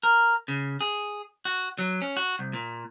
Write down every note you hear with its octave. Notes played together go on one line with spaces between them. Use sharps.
A#4
C#3
G#4
F#4
F#3
C#4
F#4
C2
A#2